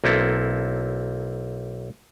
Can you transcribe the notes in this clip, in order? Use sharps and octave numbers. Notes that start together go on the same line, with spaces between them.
B1 A#3 C4 E4 A4